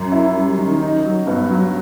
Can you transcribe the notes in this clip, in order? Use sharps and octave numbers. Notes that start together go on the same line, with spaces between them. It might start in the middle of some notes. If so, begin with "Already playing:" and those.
Already playing: F#2
E4
G3
D#3
D#4
F#3
G2 B3
F#3